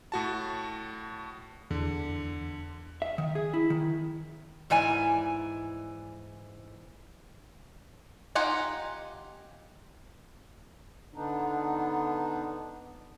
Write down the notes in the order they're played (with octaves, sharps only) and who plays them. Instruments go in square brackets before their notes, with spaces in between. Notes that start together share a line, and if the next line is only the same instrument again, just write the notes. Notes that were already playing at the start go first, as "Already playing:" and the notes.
[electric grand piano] A2 F#4 A5
[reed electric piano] E2 [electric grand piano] D3
[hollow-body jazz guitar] E5
D#3
G#4
E4
D#3
[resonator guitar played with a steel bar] G#2 E3 D5 G#5
[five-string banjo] D#4 F4 G4 F#5 G#5
[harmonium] D3 B3 D4 D#4